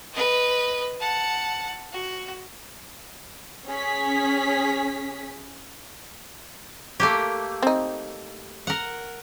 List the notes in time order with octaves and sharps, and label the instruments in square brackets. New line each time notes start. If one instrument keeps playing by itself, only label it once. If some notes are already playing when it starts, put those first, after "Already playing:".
[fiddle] B4 D#5
F#5 A5
F#4
[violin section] C#4 G#4 B6
[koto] A3 A#3 G4
[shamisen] C4 D#4
[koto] A#4 F#5